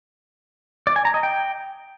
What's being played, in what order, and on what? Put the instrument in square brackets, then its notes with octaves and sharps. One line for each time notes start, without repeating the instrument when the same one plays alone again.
[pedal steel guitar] D5
G#5
A#5
D#5
G5